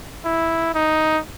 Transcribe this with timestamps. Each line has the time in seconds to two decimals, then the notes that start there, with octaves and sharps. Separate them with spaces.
0.25 E4
0.75 D#4